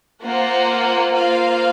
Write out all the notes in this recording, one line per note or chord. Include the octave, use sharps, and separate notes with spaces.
A#3 F4 C5 F#5
A#3 F4 C5 F5